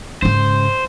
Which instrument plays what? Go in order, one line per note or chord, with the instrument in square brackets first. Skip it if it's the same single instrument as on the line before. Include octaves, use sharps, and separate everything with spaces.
[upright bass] G#2 C#3 [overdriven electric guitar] C5